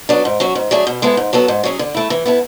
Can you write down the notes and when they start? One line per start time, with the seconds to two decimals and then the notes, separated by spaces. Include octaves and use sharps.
0.09 F#3 B3 D4
0.25 G#2
0.40 F#3 C#4 F#4
0.55 G#2
0.71 F#3 A3 D4 G#4
0.87 B2
1.02 G#3 B3 E4 A4
1.17 G#2
1.33 F#3 B3 F#4 A4
1.48 G#2
1.64 F#3 C#4 G#4
1.79 D3
1.95 A3 E4
2.10 E3
2.26 B3 E4 A4